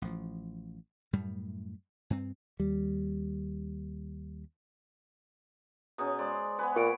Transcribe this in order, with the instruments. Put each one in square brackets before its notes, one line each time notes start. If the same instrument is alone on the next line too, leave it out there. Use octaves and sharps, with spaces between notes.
[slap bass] A1 F3
F#2 A2 G3 A3
G2 C4
[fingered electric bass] D#2 G3
[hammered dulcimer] B2 C#4 [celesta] G#4 A#5 D#6
[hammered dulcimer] G#3 C5 D5
[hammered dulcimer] B3 G#4 B4 [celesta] G#5
[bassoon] A#2 [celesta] C#6 C#7 D7